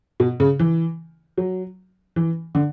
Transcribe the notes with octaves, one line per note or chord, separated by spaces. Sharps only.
B2
C#3
E3
F#3
E3
D3